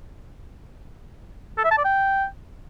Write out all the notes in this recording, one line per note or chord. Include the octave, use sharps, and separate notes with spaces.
A4
E5
A5
D5
G5